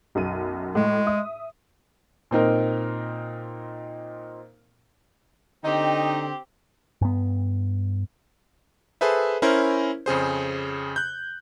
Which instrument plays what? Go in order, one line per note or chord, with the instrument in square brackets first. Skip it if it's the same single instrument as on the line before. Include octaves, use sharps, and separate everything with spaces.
[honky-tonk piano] B1 F#2 D#7
[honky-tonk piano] A2 [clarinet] G#3
[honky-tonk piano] E5 D#6
[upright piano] A#2 C4 D#4 A#4
[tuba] D3 [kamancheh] C4 G4 [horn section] D#4 [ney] G5
[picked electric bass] G2 B3
[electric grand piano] G#4 A4 B4 C5 E5
C#4 E4 A#4 C5
F2 C#3 G#4 C5
F#6 G6